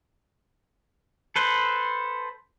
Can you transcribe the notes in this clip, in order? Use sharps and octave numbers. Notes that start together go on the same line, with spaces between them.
A4 B4 C5